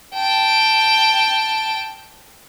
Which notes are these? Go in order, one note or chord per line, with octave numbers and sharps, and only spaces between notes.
G5 A5